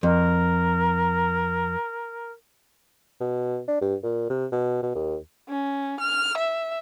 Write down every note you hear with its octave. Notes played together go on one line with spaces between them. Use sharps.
F2 A#4
B2
D4
G2
A#2
C3
B2
B2
D#2
C#4
F6
E5